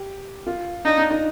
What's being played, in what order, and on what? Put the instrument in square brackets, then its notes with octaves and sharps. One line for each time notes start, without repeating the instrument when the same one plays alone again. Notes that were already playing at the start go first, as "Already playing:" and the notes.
Already playing: [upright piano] G4
F4
[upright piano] D4 [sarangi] D#4
[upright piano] D4
D#4